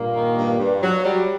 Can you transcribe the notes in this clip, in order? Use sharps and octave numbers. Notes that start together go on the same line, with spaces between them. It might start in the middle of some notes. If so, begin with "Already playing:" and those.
Already playing: G2 A#2 A#3
D#3
G2
G2
F#3
F#3 G3